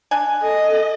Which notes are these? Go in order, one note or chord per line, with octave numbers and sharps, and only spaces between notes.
D4 G#5
A4 D#5